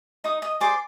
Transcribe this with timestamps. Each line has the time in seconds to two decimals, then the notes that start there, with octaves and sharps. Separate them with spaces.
0.24 D#4 D#5 D#6
0.42 D#5 D#6
0.61 G#4 C5 D5 D6